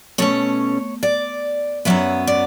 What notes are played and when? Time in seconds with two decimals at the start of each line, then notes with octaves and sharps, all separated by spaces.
0.18 B2 A3 C#4 C#5
1.03 D5
1.85 F#2 C#3 F#3 B3 E5
2.27 D5